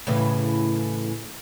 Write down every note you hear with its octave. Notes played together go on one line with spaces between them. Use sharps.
A2 C#3 E3